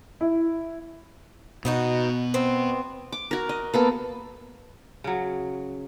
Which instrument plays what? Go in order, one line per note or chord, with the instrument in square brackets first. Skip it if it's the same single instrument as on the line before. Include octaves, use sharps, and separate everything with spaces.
[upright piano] E4
[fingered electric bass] B2 [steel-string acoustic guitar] B3 D#4 F#4
[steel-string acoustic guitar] B3 C4
[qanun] D6
F#4 A#4
D#5
A#3 B3 A4
[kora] C#3 F#3